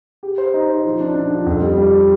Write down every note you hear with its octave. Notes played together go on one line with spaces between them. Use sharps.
G4
C5
D#4
C5
F3
D4
D4
F3
F2
G3
G3